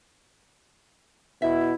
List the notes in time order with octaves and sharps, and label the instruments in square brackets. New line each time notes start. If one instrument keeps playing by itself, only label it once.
[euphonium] B2 [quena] E4 [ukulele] E5